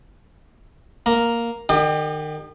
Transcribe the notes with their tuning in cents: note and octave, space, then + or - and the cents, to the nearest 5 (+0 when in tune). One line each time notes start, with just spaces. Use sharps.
A#3 +0 A#5 +0
D#3 -35 G4 +25 D#5 -40